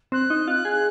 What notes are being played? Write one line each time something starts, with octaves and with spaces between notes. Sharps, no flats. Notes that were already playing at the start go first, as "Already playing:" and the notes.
C4 F#6
D#4
F4
G#4